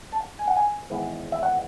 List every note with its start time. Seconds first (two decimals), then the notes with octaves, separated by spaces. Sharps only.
0.12 A5
0.39 G#5
0.48 F#5
0.57 G#5
0.90 G#1 G#2 E3 G#3 B3
1.32 E5
1.43 F#5